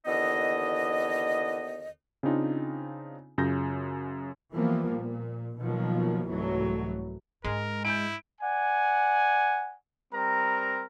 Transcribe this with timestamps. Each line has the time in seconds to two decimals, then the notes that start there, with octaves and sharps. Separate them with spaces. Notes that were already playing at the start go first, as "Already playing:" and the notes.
0.06 D#2 D3 E3 B3 D#5
2.23 C#3 C4 D4 D#4 F4 G#4
3.38 F#2 C#3 F4 G6 A#6
4.52 E3 F3 G3 A#3 B3
4.93 A#2
5.60 B2 D#3 F3 F#3 A#3
6.27 C2 G#2 E3 F#3 A3
7.44 G#2 G#3 D4 A#4
7.85 E4 G6 D7
8.41 D5 F#5 G#5
10.13 G3 C4 A#4 A#5